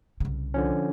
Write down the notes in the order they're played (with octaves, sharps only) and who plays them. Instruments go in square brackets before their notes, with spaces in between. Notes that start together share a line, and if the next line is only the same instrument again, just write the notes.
[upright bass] C2 C#3
[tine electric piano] D3 F3 C#4